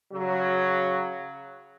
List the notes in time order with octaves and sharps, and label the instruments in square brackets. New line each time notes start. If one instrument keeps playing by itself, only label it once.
[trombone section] C#3 F#3